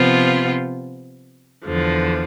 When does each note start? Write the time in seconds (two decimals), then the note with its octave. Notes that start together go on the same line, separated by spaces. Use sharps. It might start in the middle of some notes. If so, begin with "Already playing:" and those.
Already playing: C3 F3 B3 F4
1.65 E2 D3 F3